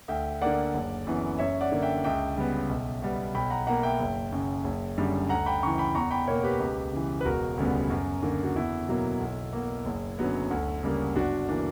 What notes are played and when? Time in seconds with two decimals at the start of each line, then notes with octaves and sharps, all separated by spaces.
0.08 D2 E5 G5
0.42 D3 A#3 D5 F#5
0.74 F#1
1.07 F#2 E3 B3
1.39 F#2 C#5 E5
1.61 D5 F#5
1.72 D3 A#3
1.83 E5 G5
2.04 C#2 E5 G5
2.37 C#3 G3 B3
2.69 B1
3.02 B2 G3 B3
3.35 B1 G5 B5
3.50 F#5 A#5
3.67 B2 A#3 F#5 A#5
3.83 E5 G5
4.00 F#1
4.32 F#2 C#3
4.64 F#1
4.97 F#2 D3 G3
5.29 D2 F#5 A#5
5.46 G5 B5
5.63 C#3 E3 A#5 C#6
5.78 G5 B5
5.95 E2 A#5 C#6
6.11 G5 B5
6.27 B2 A#3 A#4 C#5
6.44 G4 B4
6.60 C#2
6.93 C#3 E3
7.21 B4
7.25 E1 F#4 A#4
7.57 D2 C#3 G3 B3
7.90 F#2
8.23 D3 A#3
8.44 F#4
8.55 E2 E4
8.88 B2 F#3 A#3
9.20 B1
9.53 B2 A#3
9.86 F#1
10.19 F#2 D3 F#3 B3
10.51 D2
10.83 C#3 G3 A#3
11.16 G1 D4 F#4
11.48 E3 A#3 D4